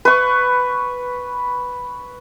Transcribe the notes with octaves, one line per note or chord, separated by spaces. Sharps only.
B4 C#6